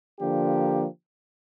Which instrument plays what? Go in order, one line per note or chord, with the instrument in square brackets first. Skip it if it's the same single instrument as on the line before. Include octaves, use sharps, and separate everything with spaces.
[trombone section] D3 F3 A#3 D4 G4